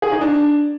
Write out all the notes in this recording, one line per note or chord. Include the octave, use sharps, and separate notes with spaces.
G#4
D#4
D4